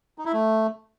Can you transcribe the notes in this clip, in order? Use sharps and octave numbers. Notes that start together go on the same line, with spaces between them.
D#4
E4
A3